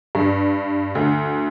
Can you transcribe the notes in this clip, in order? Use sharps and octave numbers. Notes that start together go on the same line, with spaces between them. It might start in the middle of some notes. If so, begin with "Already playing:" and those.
G2
D2